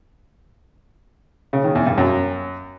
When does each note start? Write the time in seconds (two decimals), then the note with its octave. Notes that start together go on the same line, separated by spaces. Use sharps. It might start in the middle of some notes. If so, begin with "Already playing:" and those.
1.53 C#3
1.64 D#3
1.75 E2
1.87 G2
1.98 F#2